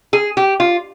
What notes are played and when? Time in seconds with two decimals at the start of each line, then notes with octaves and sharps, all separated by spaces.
0.13 G#4
0.37 G4
0.60 F4